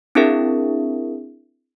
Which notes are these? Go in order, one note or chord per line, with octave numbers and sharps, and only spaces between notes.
C4 D4 E4 G#4 A#4 E5